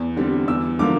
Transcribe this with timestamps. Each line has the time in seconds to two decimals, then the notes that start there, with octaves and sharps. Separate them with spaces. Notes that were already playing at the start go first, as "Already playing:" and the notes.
Already playing: E2
0.17 D3 G3 C4
0.47 E2 E6
0.79 D3 F3 A#3 D6